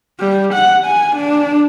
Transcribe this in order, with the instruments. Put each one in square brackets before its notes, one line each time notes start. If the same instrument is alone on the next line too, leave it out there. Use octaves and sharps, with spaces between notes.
[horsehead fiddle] G3
F#5
G#5
D4